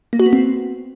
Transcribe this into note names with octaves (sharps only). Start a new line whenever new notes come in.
A#3
F#4
B3
C4